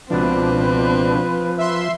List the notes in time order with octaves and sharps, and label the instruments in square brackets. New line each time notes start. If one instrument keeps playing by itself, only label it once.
[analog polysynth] C#2 B2 D4 [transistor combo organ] F3 [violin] C4 [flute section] B4
[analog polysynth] E5 C6